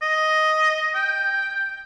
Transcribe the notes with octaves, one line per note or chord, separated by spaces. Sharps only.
D#5
G5